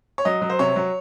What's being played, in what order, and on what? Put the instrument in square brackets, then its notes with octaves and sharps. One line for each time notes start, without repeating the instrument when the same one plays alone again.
[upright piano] C#5
F#3 D#5
F#3
C5
C3 C#5
F#3